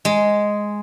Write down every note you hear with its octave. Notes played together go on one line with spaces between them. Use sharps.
G#3